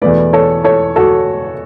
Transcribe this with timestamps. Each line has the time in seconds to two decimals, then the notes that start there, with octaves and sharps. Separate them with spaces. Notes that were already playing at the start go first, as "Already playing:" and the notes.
0.02 E2 B2 A3 B4 D5
0.33 A4 C#5
0.64 A4 C#5
0.96 F#4 A4